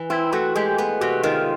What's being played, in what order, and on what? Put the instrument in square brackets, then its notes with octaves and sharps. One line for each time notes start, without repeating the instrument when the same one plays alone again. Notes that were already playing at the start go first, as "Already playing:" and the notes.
Already playing: [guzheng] E3
[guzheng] C4 [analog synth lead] E4
[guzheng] A3 [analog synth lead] F#4
[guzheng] G#3 [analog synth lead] G4
[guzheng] B3
[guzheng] C3 [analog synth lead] F#4
[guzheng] D#3 [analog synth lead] F4